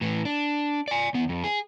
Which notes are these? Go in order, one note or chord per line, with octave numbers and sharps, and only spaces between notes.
A2 E3
D4
D5 G#5
E2 B3
F2
G#4